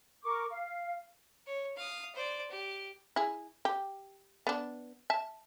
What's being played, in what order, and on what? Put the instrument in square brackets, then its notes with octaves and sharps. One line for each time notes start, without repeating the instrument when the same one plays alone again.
[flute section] A#4 C#6 D6
F5
[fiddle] C#5
F5 D#6
C5 D5
G4
[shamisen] E4 G#4
G4
B3 D4
E5 A5